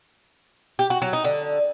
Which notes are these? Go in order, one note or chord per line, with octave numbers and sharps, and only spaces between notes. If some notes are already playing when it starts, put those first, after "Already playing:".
G4
F#4
F#3
D#4
D3